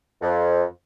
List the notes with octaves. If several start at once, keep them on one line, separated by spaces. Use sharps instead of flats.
F2